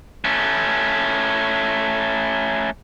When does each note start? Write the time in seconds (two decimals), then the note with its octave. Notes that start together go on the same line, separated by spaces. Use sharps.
0.25 A3 C#4